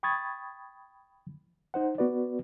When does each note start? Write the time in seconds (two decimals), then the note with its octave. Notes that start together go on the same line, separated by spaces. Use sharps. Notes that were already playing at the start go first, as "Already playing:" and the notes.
0.03 G5 B5 C#6 D#6 G#6 A6
1.74 D#4 C5 F#5
1.98 B3 F#4 B4 D5